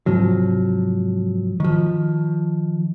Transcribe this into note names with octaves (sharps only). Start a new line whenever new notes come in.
G#2 C3 F3 F#3
D#3 F3